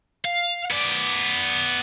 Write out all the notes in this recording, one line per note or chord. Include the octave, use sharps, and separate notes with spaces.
F5
B3 D5